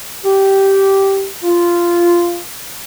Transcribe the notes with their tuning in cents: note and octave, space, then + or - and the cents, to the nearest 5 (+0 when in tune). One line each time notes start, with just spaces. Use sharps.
G4 -10
F4 -10